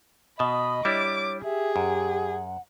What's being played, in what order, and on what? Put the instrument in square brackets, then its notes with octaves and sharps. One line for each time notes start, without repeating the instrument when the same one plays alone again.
[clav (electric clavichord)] B2 A5 [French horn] D#5 [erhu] B5 [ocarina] D#6
[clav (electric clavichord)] G3 D4 E4 [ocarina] C#5 [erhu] D6
[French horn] G4 [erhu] G#4 [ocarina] E5
[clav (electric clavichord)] F#2 [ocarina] F#5